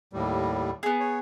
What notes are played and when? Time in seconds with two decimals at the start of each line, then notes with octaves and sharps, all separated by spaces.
0.13 D#2 A2 G3
0.83 B3 G#4
1.00 C#5